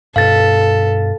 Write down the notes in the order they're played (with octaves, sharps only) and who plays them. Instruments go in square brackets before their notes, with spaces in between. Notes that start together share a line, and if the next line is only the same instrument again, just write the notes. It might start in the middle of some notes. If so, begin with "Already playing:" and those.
[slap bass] G2 B2 [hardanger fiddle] A4 [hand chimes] F5 A6